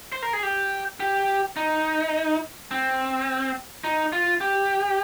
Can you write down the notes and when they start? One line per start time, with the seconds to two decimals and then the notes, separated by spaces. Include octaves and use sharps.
0.12 C5
0.22 A#4
0.33 G#4
0.43 G4
1.00 G4
1.57 D#4
2.71 C4
3.84 D#4
4.13 F4
4.41 G4